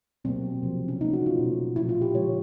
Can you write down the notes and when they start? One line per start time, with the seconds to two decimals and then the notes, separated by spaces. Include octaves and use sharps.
0.24 B2 F#3 A#3 C4
0.63 C3 F3 A#3
0.88 C#4
1.01 C#3 F#3 A#3 D#4
1.13 F#4
1.26 F4
1.38 B2 F#3 A3
1.76 A#2 F3 A3 E4
1.89 F4
2.02 G4
2.14 C#3 F3 G#3 C#5